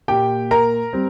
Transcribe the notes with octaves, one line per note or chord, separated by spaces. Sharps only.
A#2 A#3 G4 G5
A#4 A#5
G3 C4